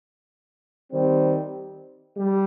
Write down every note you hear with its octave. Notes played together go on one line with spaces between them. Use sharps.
D#3 G3 C4
G3